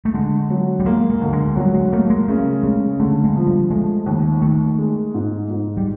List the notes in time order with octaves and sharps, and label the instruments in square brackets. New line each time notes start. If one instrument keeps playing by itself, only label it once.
[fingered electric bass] A3
[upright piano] D3 [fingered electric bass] G#3
[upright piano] F#3
[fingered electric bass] G3
[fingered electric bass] G#3 [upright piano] A#3
[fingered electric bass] G#3
[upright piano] D2
[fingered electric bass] G#3
[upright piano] F#3 [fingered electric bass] G3
[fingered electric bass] G#3
[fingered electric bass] A3 [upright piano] A#3
[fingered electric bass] G#3
[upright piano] C#3 [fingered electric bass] A3
[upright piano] C#3 [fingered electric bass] G#3
[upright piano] D3 [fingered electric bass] A3
[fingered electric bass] G#3
[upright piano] F3
[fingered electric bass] G3
[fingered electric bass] G#3 [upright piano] A3
[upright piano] D#2
[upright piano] D#3 [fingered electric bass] A3
[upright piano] G#3
G#2
G#2
[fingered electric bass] G3